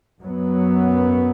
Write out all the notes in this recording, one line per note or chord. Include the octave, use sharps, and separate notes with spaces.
F#2 F#3 B3